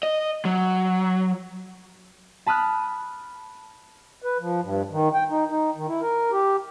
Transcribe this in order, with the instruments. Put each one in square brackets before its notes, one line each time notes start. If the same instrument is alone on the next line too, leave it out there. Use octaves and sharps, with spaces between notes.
[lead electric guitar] D#5
F#3
[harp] A5 B5 D#6 F6 F#6
[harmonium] B4
F3
G2
D#3
G5
D#4
D#4
D#3
E4
A#4
G4